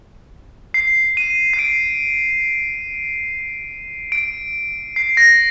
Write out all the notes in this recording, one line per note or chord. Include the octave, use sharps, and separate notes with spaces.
C7
D#7
C7
D7
D7
C7
A#6